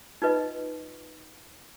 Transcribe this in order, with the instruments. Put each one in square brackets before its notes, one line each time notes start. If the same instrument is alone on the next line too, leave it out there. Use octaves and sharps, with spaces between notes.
[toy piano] D#4 F4 B4 D#5